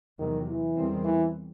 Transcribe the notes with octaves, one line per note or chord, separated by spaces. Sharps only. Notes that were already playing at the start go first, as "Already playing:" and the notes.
E2 C3 D#3 F#3
E3
E2 D#3 G3 C4
E3